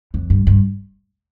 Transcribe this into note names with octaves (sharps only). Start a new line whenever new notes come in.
F2
G2
G2